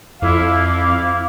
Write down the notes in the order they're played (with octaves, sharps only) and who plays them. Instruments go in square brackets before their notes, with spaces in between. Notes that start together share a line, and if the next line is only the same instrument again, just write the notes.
[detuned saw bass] F2 [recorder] E4 [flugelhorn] F5 [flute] D6